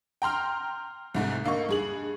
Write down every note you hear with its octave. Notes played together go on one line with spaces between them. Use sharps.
G5 A#5 C6 F6
C2 G#2 A3
D3 A#3 D#4 C#6
G2 G#4 F#7